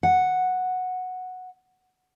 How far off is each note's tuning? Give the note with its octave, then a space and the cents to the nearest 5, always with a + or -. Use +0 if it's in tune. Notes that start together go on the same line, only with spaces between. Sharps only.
F#5 -5